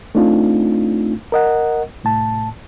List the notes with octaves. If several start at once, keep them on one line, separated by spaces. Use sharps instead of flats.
A3 C4 D4 D#4 F4
A#4 D#5 F#5
C2 A2 A5